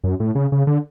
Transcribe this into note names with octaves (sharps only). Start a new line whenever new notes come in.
F#2
A2
C#3
C#3
D3